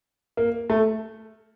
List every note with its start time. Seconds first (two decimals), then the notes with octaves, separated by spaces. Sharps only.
0.37 A#3
0.70 A3